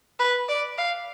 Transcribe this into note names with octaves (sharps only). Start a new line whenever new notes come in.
B4
D5
F5